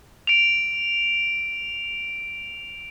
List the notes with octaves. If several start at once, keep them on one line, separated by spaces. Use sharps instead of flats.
D7 F7